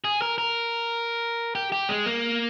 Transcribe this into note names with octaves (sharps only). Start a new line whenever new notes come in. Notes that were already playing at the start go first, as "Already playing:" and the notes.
G#4
A#4
A#4
G4
G4
G#3
A#3